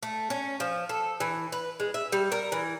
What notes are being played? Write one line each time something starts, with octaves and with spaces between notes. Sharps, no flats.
A3
C#4
F3
A4
E3
B4
G#3
E5
G3
A#4
E3